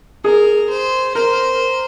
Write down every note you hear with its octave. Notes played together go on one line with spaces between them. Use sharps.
G#4 A#4
C5
A#4 C5